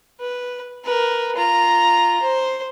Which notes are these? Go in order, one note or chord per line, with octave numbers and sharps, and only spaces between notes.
B4
A#4 B4
F4 A#5
C5